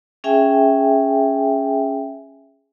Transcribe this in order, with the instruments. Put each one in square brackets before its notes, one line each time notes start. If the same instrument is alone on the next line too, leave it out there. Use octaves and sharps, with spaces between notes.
[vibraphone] C#4 G#4 E5 G5 G#5